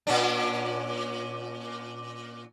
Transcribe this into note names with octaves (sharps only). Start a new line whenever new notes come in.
A#2 C#4 D4